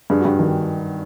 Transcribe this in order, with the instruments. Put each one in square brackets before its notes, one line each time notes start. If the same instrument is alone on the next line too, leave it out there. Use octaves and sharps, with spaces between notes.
[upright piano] G2 G#4
F#4
G2 G4
D#3